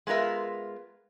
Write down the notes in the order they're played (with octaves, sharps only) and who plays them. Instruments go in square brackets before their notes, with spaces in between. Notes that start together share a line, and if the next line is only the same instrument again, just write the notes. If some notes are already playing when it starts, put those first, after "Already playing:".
[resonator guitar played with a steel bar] G#3 B3 F4 A#4 E5